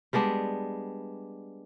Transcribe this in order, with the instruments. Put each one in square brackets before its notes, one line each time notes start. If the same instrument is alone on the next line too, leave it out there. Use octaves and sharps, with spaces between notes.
[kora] G3 G#3 B3 D4